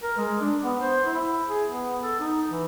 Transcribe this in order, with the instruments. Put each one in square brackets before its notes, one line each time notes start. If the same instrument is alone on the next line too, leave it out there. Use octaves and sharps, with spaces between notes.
[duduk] A#4
G#3
D4
B3
C5
E4
G#4
B3
A4
D#4
E3